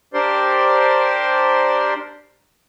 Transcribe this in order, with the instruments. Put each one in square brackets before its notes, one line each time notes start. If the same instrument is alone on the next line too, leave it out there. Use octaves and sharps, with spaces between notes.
[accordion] D4 G4 A#4 C5 D5 C6